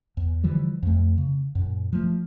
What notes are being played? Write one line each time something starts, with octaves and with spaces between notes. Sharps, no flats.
E2
D3 E3 F3 G3
F2 A3
C#3
F#2 A#2
F3 A3